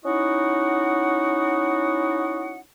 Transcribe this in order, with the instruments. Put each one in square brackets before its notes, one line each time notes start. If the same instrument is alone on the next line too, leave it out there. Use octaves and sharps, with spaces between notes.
[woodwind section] C#4 D#4 E4 F#4 D#5 F#5